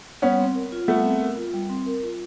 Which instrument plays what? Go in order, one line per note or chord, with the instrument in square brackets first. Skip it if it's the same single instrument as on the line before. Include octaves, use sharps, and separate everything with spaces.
[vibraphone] G3 [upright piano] B3 C#4
[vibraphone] C4
A#4
F4
[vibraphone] G3 [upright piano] A3 B3
[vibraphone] C4
A#4
F4
G3
C4
A#4
F4